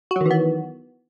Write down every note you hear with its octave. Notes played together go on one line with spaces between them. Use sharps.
D#3 E3 F#3 B3 F#4